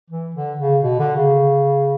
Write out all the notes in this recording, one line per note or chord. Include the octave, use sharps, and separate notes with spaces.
E3
D3
C#3
B2
D3
C#3